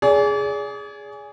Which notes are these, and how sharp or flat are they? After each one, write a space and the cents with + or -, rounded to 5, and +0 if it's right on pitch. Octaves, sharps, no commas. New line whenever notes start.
G#4 +0 D5 -40